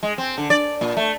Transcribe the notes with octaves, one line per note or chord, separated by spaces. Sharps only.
G#3
C4
D3
D5
A#2
A3